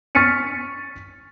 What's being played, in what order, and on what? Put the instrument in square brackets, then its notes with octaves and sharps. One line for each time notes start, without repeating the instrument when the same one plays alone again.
[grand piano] C#6 F6 A6 B6 C#7 D#7